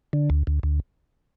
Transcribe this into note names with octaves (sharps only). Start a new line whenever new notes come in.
D3
D2
D2
D2